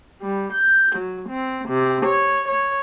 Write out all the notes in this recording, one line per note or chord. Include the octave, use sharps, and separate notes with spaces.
G3
G6
F#3
C4
C3
C#5
C#5